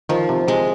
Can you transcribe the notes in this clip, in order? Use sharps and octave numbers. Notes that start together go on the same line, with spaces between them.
D#3 F3
C3
C3 G#3